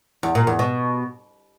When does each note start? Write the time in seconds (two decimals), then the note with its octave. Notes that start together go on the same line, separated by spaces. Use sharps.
0.23 E2
0.35 A#2
0.47 E2
0.59 B2